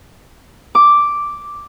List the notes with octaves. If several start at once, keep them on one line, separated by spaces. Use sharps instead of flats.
D6